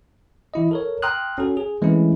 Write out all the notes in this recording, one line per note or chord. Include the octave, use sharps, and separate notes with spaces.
E3 E4 D#5
A4 A#4 C#5
G5 A#5 C6 D#6 F6 F#6
C#4 F#4 A4
G#4
E3 G#3 A3 C4 C#4 E4